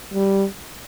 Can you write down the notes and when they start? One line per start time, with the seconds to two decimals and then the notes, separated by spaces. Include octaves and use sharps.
0.14 G3